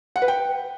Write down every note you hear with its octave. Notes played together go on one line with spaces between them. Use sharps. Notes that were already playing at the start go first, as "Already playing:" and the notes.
F#5
B4
G5